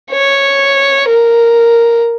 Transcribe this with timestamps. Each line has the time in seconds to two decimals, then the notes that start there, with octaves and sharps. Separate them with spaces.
0.11 C#5
1.08 A#4